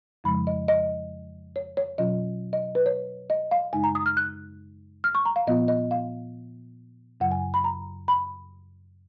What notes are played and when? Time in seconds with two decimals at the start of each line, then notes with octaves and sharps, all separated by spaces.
0.24 F2 C#3 F3 G#3 B5
0.47 D#5
0.68 D#5
1.56 C#5
1.77 C#5
1.98 B2 F#3 C#4 F4 D#5
2.53 D#5
2.75 B4
2.86 C#5
3.30 D#5
3.51 F5
3.73 F#2 C#3 G#3 D#4 G#5
3.84 A#5
3.95 D#6
4.06 F6
4.17 F#6
5.04 F6
5.15 C#6
5.25 A#5
5.36 F5
5.47 A#2 F3 B3 F4 D#5
5.68 D#5
5.91 F5
7.20 F#2 C#3 F#3 F#5
7.31 G#5
7.54 B5
7.64 A#5
8.08 B5